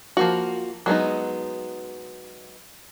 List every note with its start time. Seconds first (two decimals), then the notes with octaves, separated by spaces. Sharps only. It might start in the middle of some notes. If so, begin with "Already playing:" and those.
0.17 F3 A#3 F#4
0.86 F#3 G#3 B3 D#4